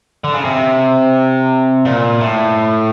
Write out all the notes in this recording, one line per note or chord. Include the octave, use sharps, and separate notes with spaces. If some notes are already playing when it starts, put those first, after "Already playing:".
D3
C#3
C3
A#2
A2